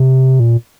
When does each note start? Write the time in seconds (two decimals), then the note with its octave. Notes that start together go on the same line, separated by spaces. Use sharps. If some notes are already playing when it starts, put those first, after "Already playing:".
Already playing: C3
0.40 A#2